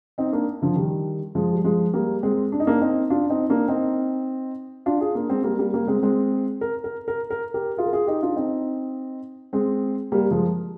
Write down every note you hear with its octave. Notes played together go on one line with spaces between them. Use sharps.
C4 D#4
A#3 D4
D3 F3
D#3 G3
F3 G#3
G3
F3 G#3
G3 A#3
G#3 C4
D4
D#4
A#3 D4
C4 D#4
D4 F4
C4 D#4
A#3 D4
C4 D#4
D4 F4
F4 G#4
A#3 D4
G#3 C4
G3 A#3
G3 A#3
G3 A#3
G#3 C4
G#3 C4
A#4
A#4
A#4
A#4
G4 A#4
F4 G#4
A#4
F4 G#4
D#4 G4
D4 F4
C4 D#4
G#3 C4
G3 A#3
F3 G#3